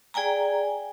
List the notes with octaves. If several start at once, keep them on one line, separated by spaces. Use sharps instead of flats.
G#4 D5 G5 G#5 A#5